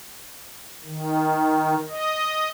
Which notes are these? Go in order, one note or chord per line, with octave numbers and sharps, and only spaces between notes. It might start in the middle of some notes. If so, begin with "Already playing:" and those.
D#3
D#5